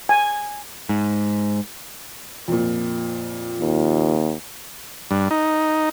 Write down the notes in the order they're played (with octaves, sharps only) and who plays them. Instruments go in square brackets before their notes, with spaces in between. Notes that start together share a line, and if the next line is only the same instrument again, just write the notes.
[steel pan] G#5
[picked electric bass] G#2
[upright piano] F2 A#2
[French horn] D#2
[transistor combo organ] G2
D#4